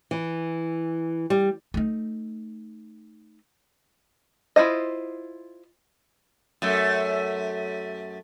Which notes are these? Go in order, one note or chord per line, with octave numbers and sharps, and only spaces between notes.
E3
G3
A3 D#4
E4 F4 C5 D#5
F#2 A3